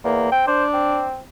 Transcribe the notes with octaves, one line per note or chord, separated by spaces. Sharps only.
E2 A#3
C4 G5
D4 C5
C4